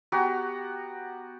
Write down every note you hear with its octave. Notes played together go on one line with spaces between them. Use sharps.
B3 F#4 G4 A#5